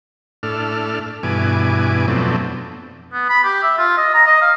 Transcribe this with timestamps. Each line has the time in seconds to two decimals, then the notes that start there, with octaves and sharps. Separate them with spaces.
0.43 A2 D4 A4 F6
1.23 G2 B2 E3 G#5 D6
2.08 F2 B2 F#3 A3 C4 D4
3.13 B3
3.29 B5
3.44 G4
3.63 E5
3.78 F4
3.97 D#5
4.14 A#5
4.27 D#5
4.42 F5